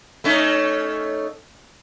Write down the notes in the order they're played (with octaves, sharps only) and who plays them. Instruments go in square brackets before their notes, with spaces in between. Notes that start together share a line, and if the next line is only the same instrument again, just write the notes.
[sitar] A3 C#4 D#4